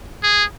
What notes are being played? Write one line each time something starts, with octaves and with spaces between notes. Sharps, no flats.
G#4